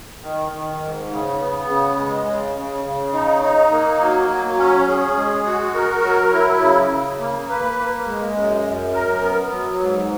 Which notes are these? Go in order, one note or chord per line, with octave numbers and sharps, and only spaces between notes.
D#3
D#3
G#2
C#3
B3
C#3
G#3
C#3
C#3
C#3
D#4
D#4
A#3
F#3
F#3
C#4
G#4
G#3
F#4
A#4
F#3
E4
C#3
C#3
A#3
B4
A#3
G#3
F#2
F#2
A#4
B3
F#3
G#2